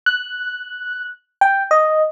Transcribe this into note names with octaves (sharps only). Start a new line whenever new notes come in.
F#6
G5
D#5